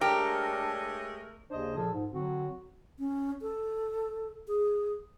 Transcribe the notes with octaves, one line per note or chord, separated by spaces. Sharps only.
G#3 A3 D4 G4 A#4 C#5
D#2 C#3 D4 C5 D#5
A#2 F3 G#4 A4
G#2
D3 F#3 C4 F#4
C#4
A4
G#4